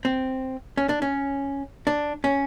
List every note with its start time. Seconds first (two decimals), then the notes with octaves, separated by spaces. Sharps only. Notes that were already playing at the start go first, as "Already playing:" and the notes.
0.05 C4
0.78 C#4
0.89 D4
1.02 C#4
1.87 D4
2.24 C#4